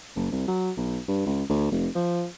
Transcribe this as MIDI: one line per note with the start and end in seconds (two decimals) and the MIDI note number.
0.16 0.27 30
0.31 0.46 36
0.48 0.71 54
0.77 0.99 35
1.08 1.25 43
1.26 1.44 37
1.49 1.71 38
1.72 1.88 29
1.95 2.26 53